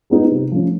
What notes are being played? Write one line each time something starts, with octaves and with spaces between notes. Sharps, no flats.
G#3 B3 D#4
C3
F3 A3 C#4